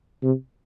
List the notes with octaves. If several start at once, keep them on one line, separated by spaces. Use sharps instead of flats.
C3